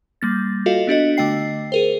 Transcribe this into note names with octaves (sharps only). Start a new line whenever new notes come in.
G3 A#3 A6
F4 F#4 A4 D#5 F5
B3 D4 F#4 D#5
D3 A3 D#5 G5 C7
G#4 A#4 C5